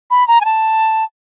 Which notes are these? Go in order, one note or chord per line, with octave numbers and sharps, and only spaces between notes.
B5
A#5
G#5
A5